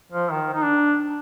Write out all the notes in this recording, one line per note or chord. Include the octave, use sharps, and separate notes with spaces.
F3
D#3
D#4
D4